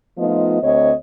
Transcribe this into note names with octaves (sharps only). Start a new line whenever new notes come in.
F3 A3 B3 D#4 F4 D#5
D2 C4 C#5 D#5